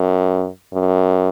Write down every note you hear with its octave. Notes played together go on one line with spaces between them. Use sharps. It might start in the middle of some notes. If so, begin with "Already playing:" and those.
Already playing: F#2
F#2